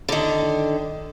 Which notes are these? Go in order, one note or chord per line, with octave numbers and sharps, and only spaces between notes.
D3 D#3